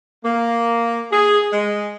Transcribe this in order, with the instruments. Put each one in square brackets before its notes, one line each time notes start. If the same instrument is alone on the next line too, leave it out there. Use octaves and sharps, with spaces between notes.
[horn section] A#3
G#4
G#3